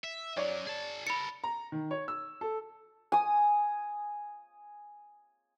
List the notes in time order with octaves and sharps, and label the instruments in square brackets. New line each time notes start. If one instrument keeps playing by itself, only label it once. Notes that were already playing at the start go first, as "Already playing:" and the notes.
[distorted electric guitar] E5
[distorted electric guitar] F#2 F#3 [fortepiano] C#5 D5
[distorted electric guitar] G#4 A5
[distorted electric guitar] A4 A#4 [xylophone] B5 C#7
[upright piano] A#5
D#3
C#5
E6
A4
[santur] G#5 D#6